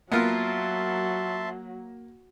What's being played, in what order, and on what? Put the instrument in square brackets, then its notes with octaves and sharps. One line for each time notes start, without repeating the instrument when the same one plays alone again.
[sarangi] F#3 [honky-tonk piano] A#3 [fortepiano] B3 F4 A#4 [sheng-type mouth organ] E5 A5 C6